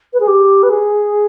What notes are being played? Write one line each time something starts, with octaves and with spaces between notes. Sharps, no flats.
B4
G#4
G4
B4
G#4